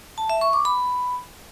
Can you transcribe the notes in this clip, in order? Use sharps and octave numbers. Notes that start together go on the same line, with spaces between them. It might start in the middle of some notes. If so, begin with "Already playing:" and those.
A5
E5
C#6
D6
B5